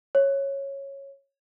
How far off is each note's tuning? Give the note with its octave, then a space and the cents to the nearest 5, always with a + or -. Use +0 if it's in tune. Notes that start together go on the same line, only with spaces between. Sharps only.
C#5 -10